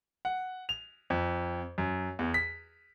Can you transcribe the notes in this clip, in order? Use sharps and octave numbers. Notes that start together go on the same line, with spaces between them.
F#5
F7
F2
F#2
E2
B6